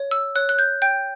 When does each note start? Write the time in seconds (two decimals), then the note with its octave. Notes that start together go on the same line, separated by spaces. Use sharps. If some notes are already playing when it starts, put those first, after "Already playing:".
Already playing: C#5
0.11 E6
0.36 C#5 F#6
0.49 F#6
0.59 G6
0.82 G5 G6